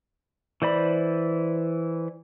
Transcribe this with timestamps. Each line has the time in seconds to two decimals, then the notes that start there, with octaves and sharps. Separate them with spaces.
0.62 E3 C5 D5 B5